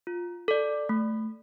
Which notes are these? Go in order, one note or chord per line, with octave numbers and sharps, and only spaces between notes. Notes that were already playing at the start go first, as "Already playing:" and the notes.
F4
A4 D5
A3